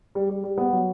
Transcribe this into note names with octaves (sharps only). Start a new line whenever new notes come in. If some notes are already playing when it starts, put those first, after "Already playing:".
G3
G3
G3
B3
F#3